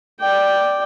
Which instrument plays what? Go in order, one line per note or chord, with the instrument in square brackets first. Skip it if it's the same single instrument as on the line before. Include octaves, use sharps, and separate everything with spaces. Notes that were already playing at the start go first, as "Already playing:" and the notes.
[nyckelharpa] D5 G5